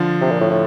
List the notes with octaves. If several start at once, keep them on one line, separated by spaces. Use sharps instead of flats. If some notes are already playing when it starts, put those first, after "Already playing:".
Already playing: D3 F3
C3
A#2
A2
A2